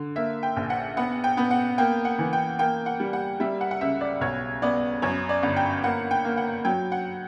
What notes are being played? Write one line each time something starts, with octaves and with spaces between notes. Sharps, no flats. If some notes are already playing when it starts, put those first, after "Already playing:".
Already playing: D3
A#3 E5
G5
A#1
F#5
B3 F#5
G5
B3
F#5
A#3 G5
F#5
E3
G5
A#3 G5
F#5
G3
F#5
G3 E5
F#5
F#5
C#2 E5
D5
B1 C#5
B3 D5
F#2 C#5
D5
G1
G5
A#3 F#5
G5
A#3
F#5
F#3 G5
F#5